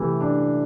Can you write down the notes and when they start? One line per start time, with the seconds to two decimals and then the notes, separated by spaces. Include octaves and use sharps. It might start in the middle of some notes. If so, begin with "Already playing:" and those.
Already playing: C3 E3 A3 G4
0.21 D4